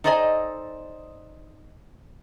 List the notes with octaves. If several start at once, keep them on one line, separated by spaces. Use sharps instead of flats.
D#4 A4 C5 D5 D#5 G#5